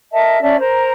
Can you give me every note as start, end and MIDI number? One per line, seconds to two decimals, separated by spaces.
0.12 0.39 70
0.12 0.39 75
0.12 0.39 76
0.12 0.39 81
0.41 0.56 61
0.41 0.56 74
0.41 0.56 76
0.41 0.56 81
0.58 0.93 70
0.58 0.93 72
0.58 0.93 82